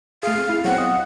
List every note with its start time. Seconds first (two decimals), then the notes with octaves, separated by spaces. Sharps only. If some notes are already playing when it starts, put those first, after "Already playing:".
0.23 A3 G#4 F5
0.38 C4
0.49 E4 G#4
0.65 F#3 B3 C4 F#5
0.78 D#5 D#6